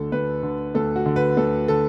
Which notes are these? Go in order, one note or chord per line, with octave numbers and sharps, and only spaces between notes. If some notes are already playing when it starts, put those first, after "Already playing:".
Already playing: D2 D3 A4
D2 B4
D3
D2 A4
F#4
D3
B4
D2 A4
D3 A4